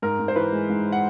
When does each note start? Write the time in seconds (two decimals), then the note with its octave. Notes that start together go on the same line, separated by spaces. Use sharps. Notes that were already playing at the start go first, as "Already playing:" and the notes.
0.02 G#2 A#4
0.19 G#2
0.28 C5
0.36 E3 B4
0.52 G#3
0.69 G#2
0.92 F#5